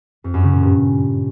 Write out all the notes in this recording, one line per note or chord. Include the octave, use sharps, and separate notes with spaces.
F2
F#2
C#3
A#2
G2